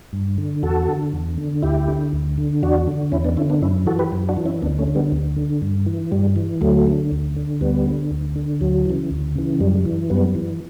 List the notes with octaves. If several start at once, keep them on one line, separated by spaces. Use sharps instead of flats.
G2
D3
E2 F#4 A4
D3
E2
D3
D2 E4 G4
D3
D2
D3
E2 D4 F#4
D3
E2 C#4 E4
B3 D4
D3 C#4 E4
B3 D4
F#2 C#4 E4
E3 F#4 A4
G4 B4
F#2
D4 F#4
E3
C#4 E4
D2 B3 D4
A3 C#4
D3
G3 B3
D2
D3
G2
E3
G2 G3
E3
D2 F#3 A3
D3
D2
D3
D2 G3 B3
D3
D2
D3
D2 F#3
C#3 E3
D2
C#3 E3
F#2 G3
E3
F#2 G3 B3
E3